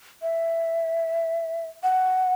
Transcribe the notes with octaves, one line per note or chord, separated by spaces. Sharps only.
E5
F#5